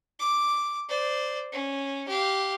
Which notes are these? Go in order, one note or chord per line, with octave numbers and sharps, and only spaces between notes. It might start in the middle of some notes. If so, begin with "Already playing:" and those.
D6
C5 D5
C#4
G4 F5